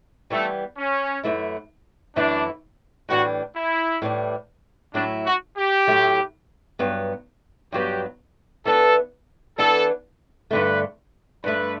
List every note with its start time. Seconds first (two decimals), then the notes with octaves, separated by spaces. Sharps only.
0.30 E3 G3 A3 B3
0.77 C#4
1.23 F#2 E3 A3 E4
2.16 F#2 E3 A3 D4 E4
3.08 A2 E3 G3 D4 F#4
3.55 E4
4.02 A2 E3 G3 D4
4.94 A2 F#3 A3 D4 E4
5.25 F#4
5.57 G4
5.87 A2 F#3 A3 E4
6.79 G2 F#3 B3
7.72 G2 F#3 B3 G4
8.65 E3 B3 D4 A4
9.58 E3 B3 D4 A4
10.51 G2 D3 A3 B4
11.44 G2 D3 A3 B4